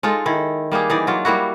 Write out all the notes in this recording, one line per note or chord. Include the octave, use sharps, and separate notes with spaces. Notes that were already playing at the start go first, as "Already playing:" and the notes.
G#3 D#4 F4 A4
D#3 E4
G3 A#3 G4 G#4
E3 D#4 D5
F#3 F4
G3 A#3 E4 F#4